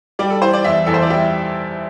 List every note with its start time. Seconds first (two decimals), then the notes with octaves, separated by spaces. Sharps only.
0.19 G3 D5
0.30 A4
0.41 E3 C5
0.53 D5
0.64 E2 E5
0.86 E2 A4
0.94 C5
1.02 D5
1.10 G3 E5